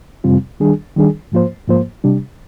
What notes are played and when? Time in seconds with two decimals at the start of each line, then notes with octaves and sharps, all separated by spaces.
0.24 F2 C3 G3 C4 F4
0.60 D#3 G3 D4 G#4
0.96 D#3 G3 D4 G#4
1.32 G#2 F3 A#3 F4 C5
1.67 G#2 F3 A#3 F4 C5
2.04 C3 G3 D4 G4